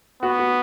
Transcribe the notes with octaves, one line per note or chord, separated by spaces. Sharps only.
B3 F#4
F#4